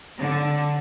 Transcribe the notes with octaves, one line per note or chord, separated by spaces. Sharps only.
D3